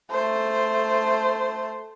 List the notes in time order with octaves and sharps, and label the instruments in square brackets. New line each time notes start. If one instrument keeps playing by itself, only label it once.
[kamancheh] A3 C5